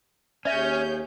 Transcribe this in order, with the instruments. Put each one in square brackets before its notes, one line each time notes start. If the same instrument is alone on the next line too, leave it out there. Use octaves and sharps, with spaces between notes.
[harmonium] D#2 [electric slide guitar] C#4 [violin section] G#4 C#5 G6 [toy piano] D5 E5